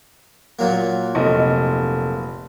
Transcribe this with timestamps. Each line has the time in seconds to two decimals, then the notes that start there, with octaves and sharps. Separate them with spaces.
0.59 A#2 F#3 A#3
1.15 F1 D#5